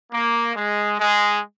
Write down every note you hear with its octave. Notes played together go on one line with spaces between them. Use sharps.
A#3
G#3
G#3